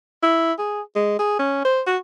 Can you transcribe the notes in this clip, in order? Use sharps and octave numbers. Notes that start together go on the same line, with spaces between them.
E4
G#4
G#3
G#4
C#4
C5
F#4